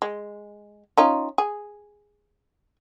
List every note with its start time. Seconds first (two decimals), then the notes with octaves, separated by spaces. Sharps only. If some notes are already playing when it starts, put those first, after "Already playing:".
0.02 G#3
0.97 C#4 D#4 F4
1.38 G#4